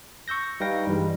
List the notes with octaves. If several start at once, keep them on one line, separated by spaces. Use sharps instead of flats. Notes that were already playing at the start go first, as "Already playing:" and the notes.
C#6 E6 G6 A#6
G3 D#4 B4 F5 G5 A#6
G2 E3 G3 G#3